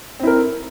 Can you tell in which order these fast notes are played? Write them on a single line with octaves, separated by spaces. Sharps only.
C4 E4 A#4